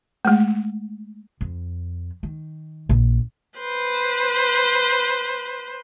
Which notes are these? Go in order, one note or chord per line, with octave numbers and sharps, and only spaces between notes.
G#3 A3
F2
D#3
A#1
B4 C5